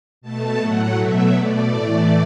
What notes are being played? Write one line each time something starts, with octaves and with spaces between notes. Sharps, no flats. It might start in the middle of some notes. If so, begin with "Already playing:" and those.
B2 A3 A5
A2 F#3 A3 F#5
B2 F#3 A3 E5
B2 A3 D5
A2 E3 A3